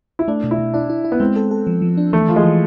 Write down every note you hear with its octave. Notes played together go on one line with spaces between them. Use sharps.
E4
A3 D4
B2
E4
B2
D4 E4
E4
E4
B3
G#3 C4
A4
A4
F3
F3
D4
E3 A3
E3 F3
G#3
E3